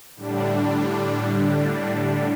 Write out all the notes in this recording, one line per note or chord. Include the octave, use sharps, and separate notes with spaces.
A2 D3 G3 D4